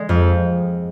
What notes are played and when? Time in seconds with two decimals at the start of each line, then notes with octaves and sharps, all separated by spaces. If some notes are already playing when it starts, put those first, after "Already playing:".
Already playing: G#3
0.09 F2